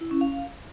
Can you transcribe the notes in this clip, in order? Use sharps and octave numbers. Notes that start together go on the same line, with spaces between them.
E4
C#4
F5